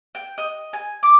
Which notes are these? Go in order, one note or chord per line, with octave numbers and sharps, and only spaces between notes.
G5
D#5
G#5
D6